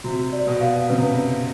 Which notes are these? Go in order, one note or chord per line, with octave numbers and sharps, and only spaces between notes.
C3 F#4
D5
B2
F5
C#3 B4
C3